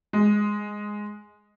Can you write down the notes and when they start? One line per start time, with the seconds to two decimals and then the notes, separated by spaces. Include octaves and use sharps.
0.13 G#3